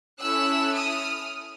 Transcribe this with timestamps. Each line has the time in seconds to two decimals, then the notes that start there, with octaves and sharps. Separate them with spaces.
0.19 C#4 E4 A4 E6 F#6
0.74 D#6 F6